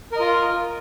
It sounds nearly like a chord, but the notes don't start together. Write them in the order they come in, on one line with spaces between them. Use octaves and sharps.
A#4 D#5 F4